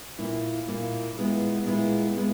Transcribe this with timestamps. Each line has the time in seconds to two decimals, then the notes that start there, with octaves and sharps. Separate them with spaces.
0.19 A#2 A#3 E4
0.68 A#2 A#3 E4
1.17 A#2 G#3 B3 E4
1.66 A#2 G#3 B3 E4
2.16 A#2 G#3 B3 E4